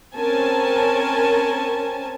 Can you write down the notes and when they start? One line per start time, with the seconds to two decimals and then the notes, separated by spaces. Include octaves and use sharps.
0.17 C4 C#4 A#4 G#5 A5